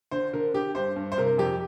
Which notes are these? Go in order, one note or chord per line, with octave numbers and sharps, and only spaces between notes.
D3 C5
D3 A#4
D3 G4
G2 C5
G2
C5
C3 A#4
F2 G4